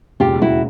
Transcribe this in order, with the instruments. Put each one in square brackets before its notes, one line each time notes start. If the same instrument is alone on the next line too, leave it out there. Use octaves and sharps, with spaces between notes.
[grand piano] E1 D#2 C#3 [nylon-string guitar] F4 G4
[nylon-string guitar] E4 F#4